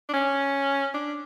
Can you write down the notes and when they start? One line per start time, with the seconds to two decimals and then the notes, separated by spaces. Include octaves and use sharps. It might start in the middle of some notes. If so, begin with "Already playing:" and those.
0.09 D4
0.13 C#4
0.94 D4